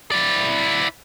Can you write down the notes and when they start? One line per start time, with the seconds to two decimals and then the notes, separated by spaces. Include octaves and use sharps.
0.11 E4 D5